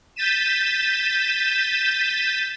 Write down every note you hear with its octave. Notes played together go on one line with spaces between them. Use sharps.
G6 A6 B6 D#7 E7